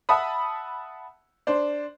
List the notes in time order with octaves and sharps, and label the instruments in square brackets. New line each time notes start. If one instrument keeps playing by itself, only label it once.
[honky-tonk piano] E5 F#5 A5 B5 D#6
D4 C5